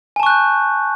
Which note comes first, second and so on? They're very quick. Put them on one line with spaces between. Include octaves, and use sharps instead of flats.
G#5 A5 C#6 F#6 G6